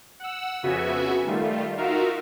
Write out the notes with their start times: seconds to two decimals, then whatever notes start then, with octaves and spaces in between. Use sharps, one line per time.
0.20 F#5 E6
0.63 F2 C#3 B3 F#4 E5 G#5
1.26 D#3 G3 A3 F4
1.77 D#4 F4 F#4 A#4 E5 F5